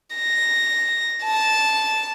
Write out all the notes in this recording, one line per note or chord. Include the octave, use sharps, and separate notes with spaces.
A#6
A5